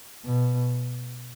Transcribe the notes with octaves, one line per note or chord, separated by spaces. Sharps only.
B2